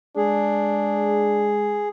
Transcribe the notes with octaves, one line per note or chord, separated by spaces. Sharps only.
G#3 D4 G#4